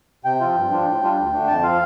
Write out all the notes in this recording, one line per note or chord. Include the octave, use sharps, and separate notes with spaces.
C3 G5
F3 C4 F4
G2
F3 D4 F4
A2
G3 D4 F4
D2
D3 A3 D4
F2 A5
F3 C4 F4 F5